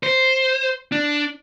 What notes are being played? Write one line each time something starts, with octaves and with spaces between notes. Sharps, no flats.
C5
D4